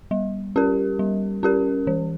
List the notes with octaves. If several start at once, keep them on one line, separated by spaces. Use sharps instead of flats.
G3
C#4 G4 A#4
G3
C#4 G4 A#4
E3